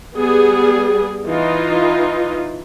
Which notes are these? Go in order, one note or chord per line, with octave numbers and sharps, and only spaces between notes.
G3 B3 G#4
E3 D#4 F4